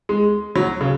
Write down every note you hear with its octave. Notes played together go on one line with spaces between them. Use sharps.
G#3
F#3
C#3